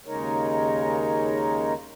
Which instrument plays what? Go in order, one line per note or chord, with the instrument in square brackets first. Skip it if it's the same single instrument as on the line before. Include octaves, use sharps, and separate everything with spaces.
[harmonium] D#2 C#3 G#3 D#4 A#4 C#5